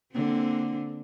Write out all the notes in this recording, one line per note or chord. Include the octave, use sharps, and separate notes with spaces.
D3 A#3 C4